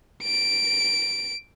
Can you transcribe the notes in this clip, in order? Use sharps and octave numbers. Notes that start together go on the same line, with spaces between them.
D7